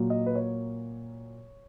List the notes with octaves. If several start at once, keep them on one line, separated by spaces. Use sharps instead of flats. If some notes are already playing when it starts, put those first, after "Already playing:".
Already playing: A#2 F#3 A#3
D#5
B4
C#5